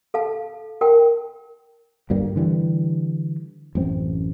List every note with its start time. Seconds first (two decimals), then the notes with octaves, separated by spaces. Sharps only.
0.14 A4 F5 A5
0.81 A#4 G5 A5
2.10 D2 G2 G3 A#3
2.36 D3 E3 G3
3.75 A1 F#2 C4